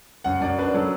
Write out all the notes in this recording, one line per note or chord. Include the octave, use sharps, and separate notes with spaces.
F#2 F#5
F#2 D5
D4 B4
F#3 A4